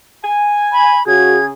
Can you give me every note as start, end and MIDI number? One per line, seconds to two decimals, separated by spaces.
0.25 0.99 80
0.73 1.06 83
1.07 1.50 49
1.07 1.37 66
1.07 1.50 68
1.07 1.45 92